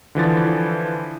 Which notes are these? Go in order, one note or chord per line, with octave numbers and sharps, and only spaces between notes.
D3 E3 F3 A6